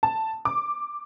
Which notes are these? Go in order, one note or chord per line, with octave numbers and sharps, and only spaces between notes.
A5
D6